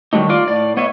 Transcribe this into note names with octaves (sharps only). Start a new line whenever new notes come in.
D#3 F#3 G3 A3 D#4
D#4 F4 D5
A2 D5
B3 C#5 D#5 E5